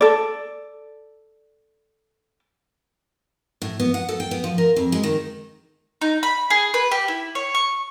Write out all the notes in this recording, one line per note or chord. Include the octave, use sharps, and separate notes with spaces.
A4 D5
A2
B3
F#5
A4
G5
B3
F3
A#4
F2
G#3
D#3
D#4
B5
G#4
B4
G4
E4
C#5
C#6